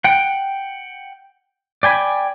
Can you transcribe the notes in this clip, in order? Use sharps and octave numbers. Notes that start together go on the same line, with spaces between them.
F#5 G5
D5 G5 G#5 B5